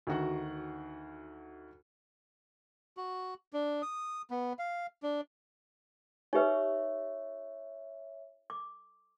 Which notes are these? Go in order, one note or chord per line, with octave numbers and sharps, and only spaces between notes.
D2 D#3 F#4 F#5
F#4
D4
D#6
B3
F5
D4
D#4 G4 B4 C#5 E5
D6